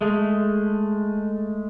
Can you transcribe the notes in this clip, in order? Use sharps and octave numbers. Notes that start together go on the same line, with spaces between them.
G#3 A3